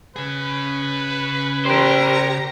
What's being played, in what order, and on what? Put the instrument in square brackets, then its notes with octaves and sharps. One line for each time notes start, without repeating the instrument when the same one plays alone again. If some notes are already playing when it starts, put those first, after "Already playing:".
[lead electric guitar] C#3 G#4 [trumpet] B4
[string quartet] G4 A#5 [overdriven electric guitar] A#4 C5